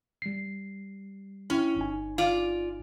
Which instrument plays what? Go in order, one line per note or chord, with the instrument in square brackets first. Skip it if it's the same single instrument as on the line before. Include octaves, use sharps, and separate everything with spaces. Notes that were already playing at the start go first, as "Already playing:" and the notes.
[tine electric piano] G3 C7
[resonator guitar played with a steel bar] C#4 [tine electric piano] E4 G5
[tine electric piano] G1 D#4 G#5
[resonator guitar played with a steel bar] F4 D5